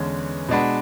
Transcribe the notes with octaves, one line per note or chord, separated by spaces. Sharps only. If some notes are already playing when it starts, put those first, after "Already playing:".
Already playing: E2 D3 G#3 C#4
B2 G#3 D4 F#4 B4